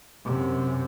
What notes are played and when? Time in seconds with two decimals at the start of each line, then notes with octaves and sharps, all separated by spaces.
0.25 F#2 C3